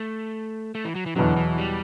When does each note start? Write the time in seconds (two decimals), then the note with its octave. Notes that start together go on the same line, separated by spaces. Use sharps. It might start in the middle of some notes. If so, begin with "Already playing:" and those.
Already playing: A3
0.75 A3
0.85 E3
0.95 F#3
1.06 E3
1.16 E2 B2 D3 F#3
1.36 E3
1.58 G3